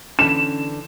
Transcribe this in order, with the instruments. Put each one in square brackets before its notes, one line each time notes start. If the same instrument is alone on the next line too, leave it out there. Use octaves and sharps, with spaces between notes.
[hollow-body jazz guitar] D3 E3 B4 [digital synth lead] C#4 [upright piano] E7